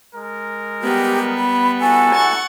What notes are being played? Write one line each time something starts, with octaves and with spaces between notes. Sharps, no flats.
G#3 A#4
G3 B3 G4
B5
E4 F#4 A4 G#5
F#5 C#6 A6